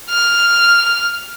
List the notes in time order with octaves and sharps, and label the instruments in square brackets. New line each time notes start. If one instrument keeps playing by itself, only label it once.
[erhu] F6